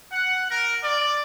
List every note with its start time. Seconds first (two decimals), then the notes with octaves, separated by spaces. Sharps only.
0.12 F#5
0.51 A#4
0.83 D5